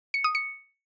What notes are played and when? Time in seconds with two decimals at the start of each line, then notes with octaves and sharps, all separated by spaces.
0.14 C#7
0.24 D#6
0.35 C#7